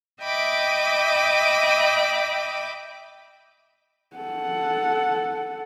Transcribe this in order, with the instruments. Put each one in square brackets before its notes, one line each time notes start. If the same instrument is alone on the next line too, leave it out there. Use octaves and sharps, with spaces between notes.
[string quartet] D#5 E5 G5 B5 D6
[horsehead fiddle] A4 F#5